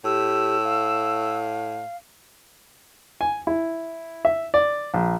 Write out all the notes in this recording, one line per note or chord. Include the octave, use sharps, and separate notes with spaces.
A2 G4 E6
F5
G#5
E4
E5
D5
A#1